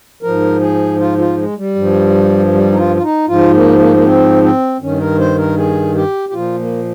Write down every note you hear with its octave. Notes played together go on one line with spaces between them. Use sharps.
G#2 F3 A#4
G#4
F4
F4
G#3
G3
G2 F3
G3
D#4
F4
F4
D#4
G#2 F3 F4
A#3
A#3
A#3
C4
C4
G2 D#3 C#4
A#4
C5
A#4
G#4
G4
G4
A#2 F3 F4
A#3